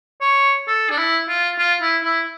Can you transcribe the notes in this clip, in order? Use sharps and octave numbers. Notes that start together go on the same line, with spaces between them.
C#5
A4
D4
E4
F4
F4
E4
E4